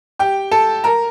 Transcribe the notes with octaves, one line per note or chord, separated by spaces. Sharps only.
G4 G5
A4 A5
A#4 A#5